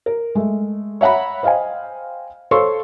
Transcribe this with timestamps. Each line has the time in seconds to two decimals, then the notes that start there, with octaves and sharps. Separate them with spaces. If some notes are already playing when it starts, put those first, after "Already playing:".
0.06 A#4
0.35 G#3 A3
1.01 C#5 E5 F#5 A#5 B5
1.43 C5 D#5 F5 G5 G#5
2.51 A4 C5 C#5 F5 C6 C#6